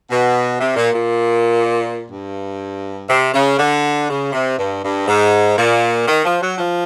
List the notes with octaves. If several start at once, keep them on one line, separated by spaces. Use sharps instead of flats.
B2
C3
A#2
A#2
G2
C3
C#3
D3
C#3
C3
G2
G2
G#2
A#2
D#3
F3
F#3
F3